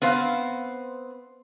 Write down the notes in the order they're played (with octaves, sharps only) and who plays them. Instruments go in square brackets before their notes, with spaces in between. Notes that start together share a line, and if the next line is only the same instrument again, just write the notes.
[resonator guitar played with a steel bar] B3 C4 C5 F5